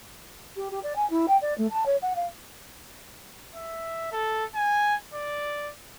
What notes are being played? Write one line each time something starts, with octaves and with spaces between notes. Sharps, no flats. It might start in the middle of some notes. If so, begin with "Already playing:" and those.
G4
G4
D5
G#5
E4
G5
D5
A3
A5
C#5
F#5
F5
E5
A4
G#5
D5